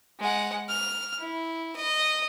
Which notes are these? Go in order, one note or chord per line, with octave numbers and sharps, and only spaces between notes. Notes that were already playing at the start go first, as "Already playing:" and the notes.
G#3 F#5
F6
E4
D#5